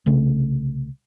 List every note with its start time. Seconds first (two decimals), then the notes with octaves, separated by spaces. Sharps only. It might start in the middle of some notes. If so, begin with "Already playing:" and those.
0.06 C2 C#3 A3